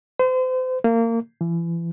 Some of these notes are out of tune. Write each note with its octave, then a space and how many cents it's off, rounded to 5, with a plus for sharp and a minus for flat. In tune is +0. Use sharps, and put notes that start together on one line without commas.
C5 -35
A#3 -25
E3 +35